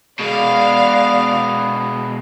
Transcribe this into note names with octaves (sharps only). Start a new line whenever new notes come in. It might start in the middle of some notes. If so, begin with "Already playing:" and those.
B2 G#3 B3 D5 F5